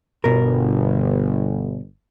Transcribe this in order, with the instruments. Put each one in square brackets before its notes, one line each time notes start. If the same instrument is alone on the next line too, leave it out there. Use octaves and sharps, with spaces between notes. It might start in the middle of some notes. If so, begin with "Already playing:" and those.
[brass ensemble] G1 [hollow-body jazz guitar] B2 A#4